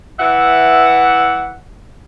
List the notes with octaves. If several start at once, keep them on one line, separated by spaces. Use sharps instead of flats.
E3 E5 F#5